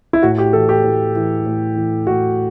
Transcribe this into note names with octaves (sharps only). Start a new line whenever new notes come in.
E4
A2 F#4
G4
E3 A4
G4
A2
E3
A2
E3
A2 F#4